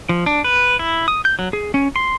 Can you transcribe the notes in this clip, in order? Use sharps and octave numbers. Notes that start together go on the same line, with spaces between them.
F3
D4
B4
E4
D#6
G6
F#3
G#4
C#4
C6